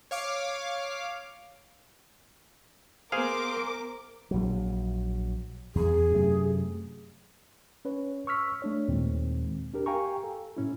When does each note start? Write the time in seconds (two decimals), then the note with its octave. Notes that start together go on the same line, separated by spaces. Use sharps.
0.11 C#5 F5 D6
3.12 B3 G#4 A#4 C5 F5 D6
4.31 A#1 F#3
5.75 E2 G#4
6.10 F#2 C3 A3
7.85 C#4 B4 C#5
8.27 C#6 E6 F6 B6
8.62 A3 D4 C#5
8.88 D#2 A#2 D#3 G#3 C4
9.74 D4 G4 A#4
9.86 G4 F5 G5 G#5 A#5 C#6
10.24 A4
10.57 A2 C#4 E4